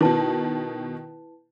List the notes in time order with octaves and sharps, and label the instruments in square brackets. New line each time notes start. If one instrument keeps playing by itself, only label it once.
[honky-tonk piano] B2 D#3 [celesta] E4 B4 A5